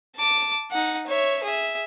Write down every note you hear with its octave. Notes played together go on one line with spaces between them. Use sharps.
A5 D6
D#4 F#5
C#5 E5
G#4 E5